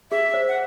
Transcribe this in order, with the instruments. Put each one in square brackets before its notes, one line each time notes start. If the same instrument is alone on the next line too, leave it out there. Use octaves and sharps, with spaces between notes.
[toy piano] G#4 [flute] E5
[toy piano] C5
[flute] F#5